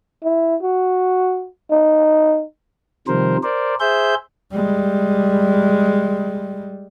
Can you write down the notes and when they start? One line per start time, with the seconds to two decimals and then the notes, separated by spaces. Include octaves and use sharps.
0.24 E4
0.63 F#4
1.71 D#4
3.08 C3 D#3 F3 G3 A#4 C5
3.43 A#4 C5 D5
3.80 G#4 C5 E5 G6
4.53 G3 G#3